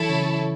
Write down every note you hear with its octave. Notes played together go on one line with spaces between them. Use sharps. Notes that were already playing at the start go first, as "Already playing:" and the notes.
Already playing: E3 F#3 E4 A4 C#5
C#3